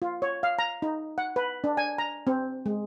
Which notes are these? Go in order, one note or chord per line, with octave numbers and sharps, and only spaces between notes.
F4
C#5
F5
A#5
D#4
F#5
B4
D4
G#5
A#5
C4
G#3